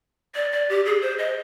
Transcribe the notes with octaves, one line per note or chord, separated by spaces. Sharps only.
D5
D5
G4
G#4
C5
D#5